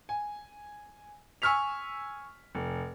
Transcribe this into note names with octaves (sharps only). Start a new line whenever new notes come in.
G#5
G#5 C#6 E6 F6 B6 F7
F1